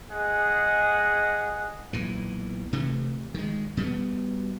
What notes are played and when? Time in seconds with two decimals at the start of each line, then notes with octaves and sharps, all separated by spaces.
0.11 G#3 G#4 D#5 F#5
1.93 B1 A#2 E3
2.73 C3 E3 A3
3.34 D#3 G#3
3.77 B2 G3 B3